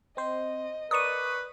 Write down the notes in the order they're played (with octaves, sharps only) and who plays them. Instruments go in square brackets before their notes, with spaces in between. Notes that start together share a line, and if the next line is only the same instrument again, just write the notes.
[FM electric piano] C4 C5 [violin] D#5
[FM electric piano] A#4 D5 C#6 [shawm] B4 [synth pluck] D#6 D#7